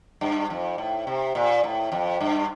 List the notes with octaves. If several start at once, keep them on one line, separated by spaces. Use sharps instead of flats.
G2
F2
A2
C3
A#2
A2
F2
G2